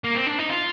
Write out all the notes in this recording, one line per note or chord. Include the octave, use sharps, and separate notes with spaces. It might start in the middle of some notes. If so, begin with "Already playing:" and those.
A#3
C4
D4
D#4
F4